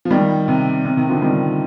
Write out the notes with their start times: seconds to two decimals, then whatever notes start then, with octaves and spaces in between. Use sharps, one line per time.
0.05 F3
0.11 D#3 G3
0.48 C3
0.85 C3
0.97 C3 D#3
1.09 D3 F3
1.22 D#3 G3